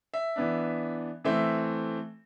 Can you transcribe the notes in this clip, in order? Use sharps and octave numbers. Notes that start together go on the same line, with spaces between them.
E5
E3 B3 D4
E3 A3 C4 E5